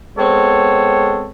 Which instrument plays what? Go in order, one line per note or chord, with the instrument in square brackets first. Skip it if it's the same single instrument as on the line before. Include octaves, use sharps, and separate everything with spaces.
[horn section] G#3 B3 C4 A4 C#5